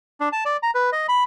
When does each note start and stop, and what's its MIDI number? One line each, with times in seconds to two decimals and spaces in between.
0.20 0.29 62
0.32 0.44 81
0.45 0.57 74
0.63 0.71 82
0.75 0.90 71
0.92 1.07 75
1.09 1.24 83